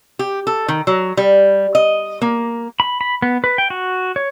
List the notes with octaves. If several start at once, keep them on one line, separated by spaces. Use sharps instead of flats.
G4
A4
D#3
F#3
G3
D#5
A#3
B5
B5
B3
B4
G5
F#4
C#5